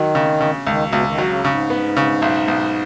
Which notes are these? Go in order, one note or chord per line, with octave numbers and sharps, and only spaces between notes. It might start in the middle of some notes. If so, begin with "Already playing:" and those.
Already playing: D#3 F#3
C#3
C#3
C#2 D#3
B2
C#2
D#3
F#3
C#3
G#2 C#3
B3
C#3
B1
B1